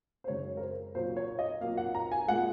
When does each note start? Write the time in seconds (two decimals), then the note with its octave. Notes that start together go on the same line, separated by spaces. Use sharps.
0.24 C5
0.28 F#2 C#3 G#3 C#5
0.57 A#4
0.61 C5
0.95 A#2 F#3 A#3 C5
1.16 C#5
1.39 D#5
1.61 A#2 F#3 A#3 F5
1.78 F#5
1.95 A#5
2.12 G#5
2.28 A#2 G#3 F#5